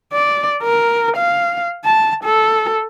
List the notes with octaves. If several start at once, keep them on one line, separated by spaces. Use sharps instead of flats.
D5
A#4
F5
A5
A4